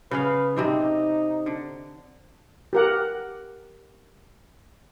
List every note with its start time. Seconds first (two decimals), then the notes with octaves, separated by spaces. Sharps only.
0.11 C#3 B3 B4 F5
0.56 C3 C4 D4 D#4
1.46 D3
2.73 G4 A#4 F#5